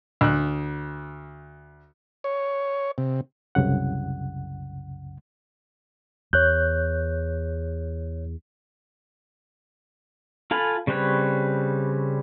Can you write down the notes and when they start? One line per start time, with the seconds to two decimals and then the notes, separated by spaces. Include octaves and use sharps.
0.21 D2 F#6
2.24 C#5
2.98 C3
3.55 C2 F#2 C#3 F#5
6.33 E2 C#5 F#6 G6
10.51 F4 A4 G#5 B5
10.87 C#3 G3 C4 B4 C#5